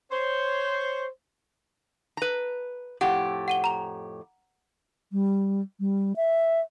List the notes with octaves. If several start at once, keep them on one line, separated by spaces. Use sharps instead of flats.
C5 C#5
B4 A#5
F2 A2 G4 F#5
F#5 D#7 G7
A#5 F7
G3
G3
E5